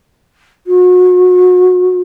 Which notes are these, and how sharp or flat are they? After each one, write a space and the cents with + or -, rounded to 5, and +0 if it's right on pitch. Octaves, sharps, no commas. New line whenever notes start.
F#4 -30